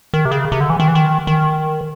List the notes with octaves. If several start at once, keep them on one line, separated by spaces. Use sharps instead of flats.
D#3
C3
C#3
C3
D3
E3
D#3
E3
D#3
D#3